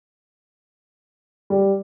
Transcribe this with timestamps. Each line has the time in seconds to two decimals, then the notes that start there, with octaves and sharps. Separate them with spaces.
1.50 G3